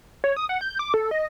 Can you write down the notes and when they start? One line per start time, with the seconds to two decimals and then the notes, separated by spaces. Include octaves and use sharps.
0.24 C#5
0.36 D#6
0.49 F#5
0.61 G6
0.79 D6
0.94 A4
1.11 D#5